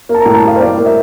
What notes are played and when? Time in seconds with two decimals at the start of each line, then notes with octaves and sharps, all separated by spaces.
0.09 A#3
0.14 A5
0.22 A2 A#5
0.35 A5
0.43 G3 F5
0.56 C5
0.60 A2 D5
0.78 A#3
0.86 E5